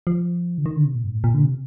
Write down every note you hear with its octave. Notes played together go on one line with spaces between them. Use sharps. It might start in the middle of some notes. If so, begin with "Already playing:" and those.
F3
D3
D#3
D3
C3
A#2
G2
A2
A#2
D3
C3